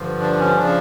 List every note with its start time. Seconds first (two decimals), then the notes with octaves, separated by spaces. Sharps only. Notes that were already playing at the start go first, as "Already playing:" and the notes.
Already playing: G2 D3 F3
0.20 D4
0.39 C#4
0.57 C#3 F3 D4